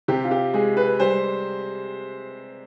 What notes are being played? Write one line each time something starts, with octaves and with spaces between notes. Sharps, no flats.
C3 G4
F4
G4
G#3 G#4
B4
G3 C5